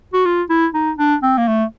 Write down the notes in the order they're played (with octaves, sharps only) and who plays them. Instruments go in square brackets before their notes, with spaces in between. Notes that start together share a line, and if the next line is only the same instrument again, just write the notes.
[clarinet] F#4
F4
E4
D#4
D4
C4
A#3
A3